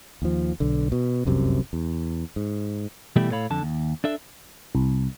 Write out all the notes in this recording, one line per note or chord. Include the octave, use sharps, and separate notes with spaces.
D#2 F3
B1 D3
B2
F1 C2 F#2 C3
E2
G#2
B2 E3 G3 A3 E4 G4
A2 A4 C#5 F5 B5
F2 D3 A5
D#2
D4 A4 E5
C2